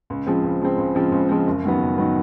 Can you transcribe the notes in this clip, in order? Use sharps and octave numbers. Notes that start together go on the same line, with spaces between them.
C#2
C#3 F3 G#3 C4
C#2
C#3 F3 G#3 C4
C#2
C#3 F3 G#3 C4
C#2
C#3 F3 G#3 C4
F#1
F#2 D#3 F#3 B3
F#1
D#3 F#3 B3